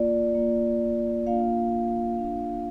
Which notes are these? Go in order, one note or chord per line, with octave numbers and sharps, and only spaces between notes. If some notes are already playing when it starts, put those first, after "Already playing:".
Already playing: A#3 F4 D5
A#3 F4
A#3 D4 F4 F5
A#3 D4 F4